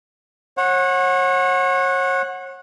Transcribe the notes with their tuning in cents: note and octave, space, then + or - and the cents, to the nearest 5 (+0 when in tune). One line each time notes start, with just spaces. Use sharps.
C#5 -35 F#5 -10